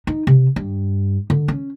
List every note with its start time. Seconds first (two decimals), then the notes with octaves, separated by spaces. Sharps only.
0.07 D#4
0.27 C3
0.56 G2
1.30 D3
1.48 C#4